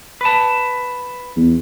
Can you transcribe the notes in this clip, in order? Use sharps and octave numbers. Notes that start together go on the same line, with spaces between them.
B4 A5
E2